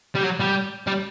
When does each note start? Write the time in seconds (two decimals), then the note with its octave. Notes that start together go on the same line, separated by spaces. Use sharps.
0.16 G3
0.24 F#3
0.40 G3
0.87 G3